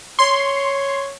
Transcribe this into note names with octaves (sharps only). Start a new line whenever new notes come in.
C#5 C6